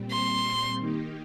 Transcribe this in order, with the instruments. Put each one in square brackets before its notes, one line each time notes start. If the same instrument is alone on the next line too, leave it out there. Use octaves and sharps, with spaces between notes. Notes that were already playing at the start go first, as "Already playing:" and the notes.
Already playing: [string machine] A#2 G3 C4
[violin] C6
[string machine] D#3 A#3 D#4 G4